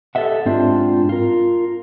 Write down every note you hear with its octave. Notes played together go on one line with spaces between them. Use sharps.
G4 A4 A#4 D#5 E5 F#5
G#2 C4 D4 F4
F4 A#4